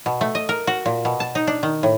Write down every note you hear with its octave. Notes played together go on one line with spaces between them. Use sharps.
B2
A3
D#5
A#4
F#4
A#2
B2
A5
D#4
D4
D#3
A2